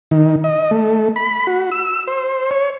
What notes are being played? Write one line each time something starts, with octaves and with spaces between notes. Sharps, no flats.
D#3
D#5
A3
B5
F#4
E6
C5
C#5